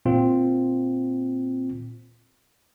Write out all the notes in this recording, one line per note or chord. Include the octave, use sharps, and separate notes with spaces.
A#2 C4 F4